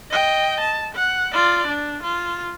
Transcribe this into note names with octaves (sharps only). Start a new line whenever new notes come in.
D#5 G5
A5
F#5
F4 D5
D4
F4